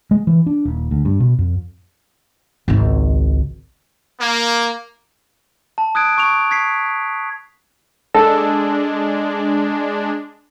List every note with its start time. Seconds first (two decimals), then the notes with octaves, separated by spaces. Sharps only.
0.11 G#3
0.27 E3
0.46 D4
0.65 D#1
0.91 D2
1.05 G2
1.20 B2
1.38 F2
2.68 G#1 C#2
4.20 A#3
5.78 A5
5.95 D#6 F#6 G#6 D7
6.18 C#6 D7 F7
6.51 G#6 B6 C7
8.14 G#3 D4 A4